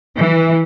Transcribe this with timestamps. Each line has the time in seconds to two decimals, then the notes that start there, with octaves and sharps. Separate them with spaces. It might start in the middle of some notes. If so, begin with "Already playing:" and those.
0.18 E3